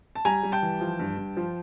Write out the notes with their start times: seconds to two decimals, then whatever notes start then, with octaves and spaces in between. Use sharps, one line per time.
0.15 A5
0.25 G3 G#5 A#5
0.43 G3
0.52 G5 A5
0.63 E3
0.81 F3
0.99 G2
1.17 G2
1.37 F3